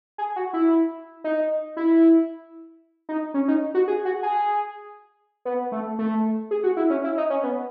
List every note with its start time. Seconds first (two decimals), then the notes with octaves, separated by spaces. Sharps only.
0.18 G#4
0.36 F#4
0.53 E4
1.24 D#4
1.77 E4
3.09 D#4
3.34 C#4
3.48 D#4
3.74 F#4
3.88 G#4
4.05 F#4
4.23 G#4
5.45 B3
5.72 A3
5.99 A3
6.51 G#4
6.64 F#4
6.77 E4
6.90 C#4
7.04 E4
7.17 D#4
7.30 C#4
7.43 B3